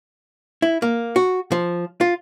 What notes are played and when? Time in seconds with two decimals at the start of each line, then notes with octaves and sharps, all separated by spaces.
0.62 E4
0.82 A#3
1.16 F#4
1.52 F3
2.01 F4